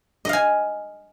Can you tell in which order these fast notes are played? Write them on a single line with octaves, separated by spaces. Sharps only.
D#5 F5 G#5